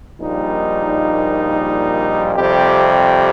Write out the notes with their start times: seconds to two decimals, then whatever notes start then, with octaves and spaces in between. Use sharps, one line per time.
0.21 A#1 A#2 G3 D#4
2.35 F2 C3 G3 G4